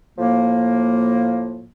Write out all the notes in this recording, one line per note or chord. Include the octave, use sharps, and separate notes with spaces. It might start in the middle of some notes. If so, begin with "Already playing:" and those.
A2 F3 A#3